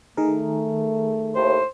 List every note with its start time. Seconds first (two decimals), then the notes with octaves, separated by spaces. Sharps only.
0.17 D#3 A3 G#4 A#4
1.35 D#2 A2 C5